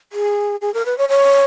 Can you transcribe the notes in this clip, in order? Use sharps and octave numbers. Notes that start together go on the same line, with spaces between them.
G#4
G#4
A#4
B4
C#5
C#5